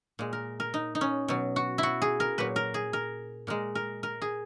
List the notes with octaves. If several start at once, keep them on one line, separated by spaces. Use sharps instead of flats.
A#2 G#3
A#4
A#4
D#4
D#4
C#4
B2 F#3
F#4
E4 F#4
G#4
A#4
A#2 F#3 B4
A#4
G#4
A#4
A#2 G#3 A#4
A#4
A#4
G#4